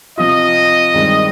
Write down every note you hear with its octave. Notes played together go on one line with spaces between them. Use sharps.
C3 F3 C4 F4 D#5
G2 D#3 G#3 C4